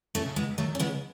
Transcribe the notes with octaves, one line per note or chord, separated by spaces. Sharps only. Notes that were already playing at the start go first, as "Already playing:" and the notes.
A3 C#4
C#3
G#3 B3
D#3 F#3 A3
C#4
C#3 G#3 B3